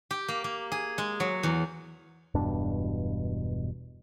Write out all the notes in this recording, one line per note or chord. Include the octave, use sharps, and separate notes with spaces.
G4
A#3
A#3
G#4
G#3
F#3
E2
E1 G2 B2 D4